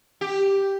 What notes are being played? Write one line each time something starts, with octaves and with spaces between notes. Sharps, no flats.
G4